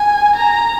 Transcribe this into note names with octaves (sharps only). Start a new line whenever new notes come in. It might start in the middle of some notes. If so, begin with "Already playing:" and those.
Already playing: G#5
A#5